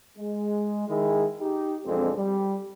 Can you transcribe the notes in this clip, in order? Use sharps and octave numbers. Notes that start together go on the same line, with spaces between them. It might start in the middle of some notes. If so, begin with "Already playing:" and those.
G#3
D#3 G#3 E4 G#4
D#4 G4
B1 F2 G#3 C4 D4 A4
G3